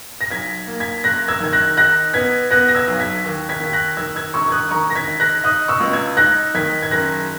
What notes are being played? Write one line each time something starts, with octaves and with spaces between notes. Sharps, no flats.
A#6
B1 G#6 B6
A#3
G#6 B6
F#1 F#6 A#6
E6 G#6
D#3 G#6
F#6 A#6
D#4 F#6 A#6
B3 G#6 B6
B3 F#6 A#6
A#6
E6 G#6
B1
G#6 B6
D#2
G#6 B6
D#2 B6
F#6 A#6
D#3 E6 G#6
E6 G#6
E1 C#6 E6
G#6
D#6 F#6
D#3 A#5 C#6
A#6
G#6 B6
D#4
F#6 A#6
D#4 D#6 F#6
C#6 E6
C#2
E6 G#6
D#4 F#6 A#6
D#3 G#6 B6
G#6
F#1 F#6 A#6